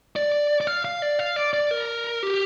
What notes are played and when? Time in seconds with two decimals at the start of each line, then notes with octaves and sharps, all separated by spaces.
0.16 D5
0.61 D5
0.67 F5
0.85 F5
1.02 D5
1.19 F5
1.36 D5
1.54 D5
1.71 A#4
2.23 G4